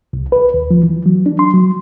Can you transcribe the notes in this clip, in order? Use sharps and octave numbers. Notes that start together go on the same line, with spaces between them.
C2
B4
D#2
F3
E3
F#3
D4
C6
F#3